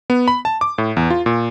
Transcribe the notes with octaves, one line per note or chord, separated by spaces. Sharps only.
B3
B5
A5
D6
A2
E2
F4
A#2